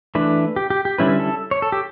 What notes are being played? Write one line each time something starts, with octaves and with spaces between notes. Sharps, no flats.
E3 A3 D4 B4
G4
G4
G4
D3 G3 C#4 E4 B4
A4
C#5
A4
G4